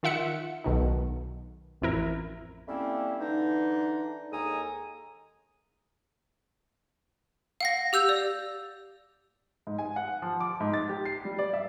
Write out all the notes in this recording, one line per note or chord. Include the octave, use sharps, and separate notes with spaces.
D#3 F4 E5 F#5 C#7
B1 B2 D#3
A1 F2 E4 A#4
G3 A3 A#3 C4 C#4 E4
D3 E3 D4 D#4
D#2 G#3 A4 G#5 A#5 D#6
F5 F#5 A#6
G4 E6 G6 F7
D5
G#2
G#5
F#5
F3
D6
G#2
A6
G4
C7
G3
D5
E5